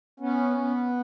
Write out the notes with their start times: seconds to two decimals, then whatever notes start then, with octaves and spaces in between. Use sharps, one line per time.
0.20 B3 C#4
0.57 B3